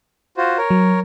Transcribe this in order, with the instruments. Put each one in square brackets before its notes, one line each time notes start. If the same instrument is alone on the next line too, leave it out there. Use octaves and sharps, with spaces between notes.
[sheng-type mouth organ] F4 F#4 C5
A#4 C#5
[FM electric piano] F#3